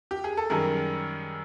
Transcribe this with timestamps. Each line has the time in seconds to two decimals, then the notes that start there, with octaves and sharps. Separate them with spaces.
0.11 G4
0.24 G#4
0.37 A4
0.50 F#2 D#3 G3 G#4 A#4